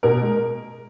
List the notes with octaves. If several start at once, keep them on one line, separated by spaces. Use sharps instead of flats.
B2 A#4
G#3